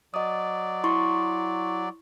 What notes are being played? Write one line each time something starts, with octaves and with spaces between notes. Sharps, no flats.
F#3 D5 D#5 D#6
E4 C6 C#6